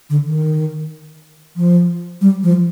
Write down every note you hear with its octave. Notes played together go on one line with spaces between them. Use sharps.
D3
D#3
F3
G3
F3